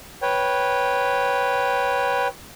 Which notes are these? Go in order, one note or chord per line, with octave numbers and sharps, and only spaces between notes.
B4 C#5 G5